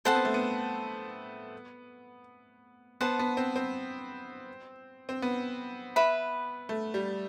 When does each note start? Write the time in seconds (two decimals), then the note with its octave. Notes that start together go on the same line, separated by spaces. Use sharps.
0.05 C4 A4 C5 F#5 A5
0.15 B3
0.25 A3
0.34 B3
3.01 B3 C5 F#5 A5
3.19 B3
3.37 C4
3.56 C4
5.09 C4
5.22 B3
5.96 B4 E5 B5
6.69 A3
6.94 G3